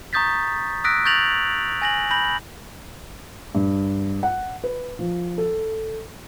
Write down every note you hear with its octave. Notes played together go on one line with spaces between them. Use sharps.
A#5 C#6 D#6 G6 A6 B6
D#6 E6 F#6 A#6 B6 D7
C#6 G6 A6 A#6 F7 F#7
G#5 A#6 F#7
B5 G6 A#6 F#7
G2
F#5
B4
F3
A4